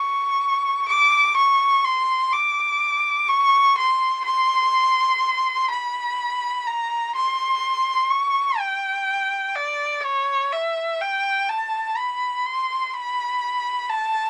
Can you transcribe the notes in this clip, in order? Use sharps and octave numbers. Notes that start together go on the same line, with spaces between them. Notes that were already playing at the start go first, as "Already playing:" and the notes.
Already playing: C#6
D6
C#6
C6
D6
C#6
C6
C6
B5
A#5
C6
C#6
G5
D5
C#5
E5
G5
A5
B5
C6
B5
A5